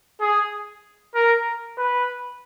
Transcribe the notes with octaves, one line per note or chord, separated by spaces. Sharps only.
G#4
A#4
B4